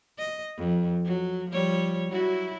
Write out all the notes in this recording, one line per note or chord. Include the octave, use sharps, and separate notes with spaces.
D#5
F2
F#3
F3 G3 C#5
F#3 E4 F#4